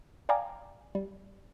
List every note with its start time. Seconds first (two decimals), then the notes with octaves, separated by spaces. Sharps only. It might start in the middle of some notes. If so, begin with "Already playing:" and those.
0.29 D5 F5 G5 G#5 A#5 D6
0.95 G3